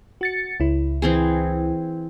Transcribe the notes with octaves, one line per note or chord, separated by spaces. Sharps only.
F#4 A6 C#7
C#2 E4
E3 C4 G#4